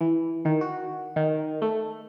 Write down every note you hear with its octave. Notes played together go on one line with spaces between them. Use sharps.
E3
D#3
F#4
D#3
A3